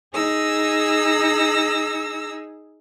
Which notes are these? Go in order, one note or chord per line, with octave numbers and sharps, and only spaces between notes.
D#4 G#4 E6 A#6